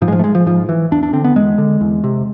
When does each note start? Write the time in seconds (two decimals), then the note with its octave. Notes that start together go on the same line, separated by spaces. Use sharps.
0.02 G#2 F3
0.08 G#3
0.12 F3
0.19 A3
0.24 G#3
0.35 F3
0.46 G#2 F3
0.69 E3
0.91 E2 D4
1.03 D4
1.13 D3 C4
1.24 B3
1.36 E2 G#3
1.58 D3
1.81 E2
2.04 C3